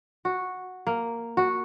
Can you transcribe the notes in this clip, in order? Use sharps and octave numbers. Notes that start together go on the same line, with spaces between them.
F#4
A#3
F#4